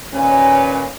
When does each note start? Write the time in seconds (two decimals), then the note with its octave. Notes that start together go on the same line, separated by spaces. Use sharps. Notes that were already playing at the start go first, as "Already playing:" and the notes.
0.13 D#2 A#2 C#4 B4